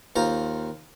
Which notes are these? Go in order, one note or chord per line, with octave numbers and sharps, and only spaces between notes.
D#2 F4 C5 A#5